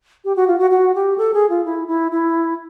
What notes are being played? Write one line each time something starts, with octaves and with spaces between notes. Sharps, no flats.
G4
F#4
F4
F#4
F#4
G4
A4
G#4
F4
E4
E4
E4